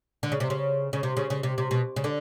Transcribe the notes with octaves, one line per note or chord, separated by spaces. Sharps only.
D3
C#3
C3
C#3
C#3
C3
C#3
C#3
C3
C3
B2
C#3
D3